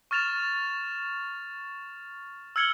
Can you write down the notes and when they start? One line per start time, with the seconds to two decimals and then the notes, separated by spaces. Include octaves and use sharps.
0.11 C#6 F6 A6 E7 F7
2.56 E6 F6 G#6 C#7 F#7 G7